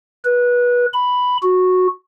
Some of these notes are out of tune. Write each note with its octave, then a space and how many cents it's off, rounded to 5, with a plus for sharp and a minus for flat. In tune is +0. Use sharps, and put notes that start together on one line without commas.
B4 -20
B5 +5
F#4 -10